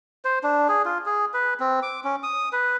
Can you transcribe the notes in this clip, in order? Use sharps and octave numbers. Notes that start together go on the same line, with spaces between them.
C5
D4
G#4
F4
G#4
B4
C4
D6
C#4
D#6
B4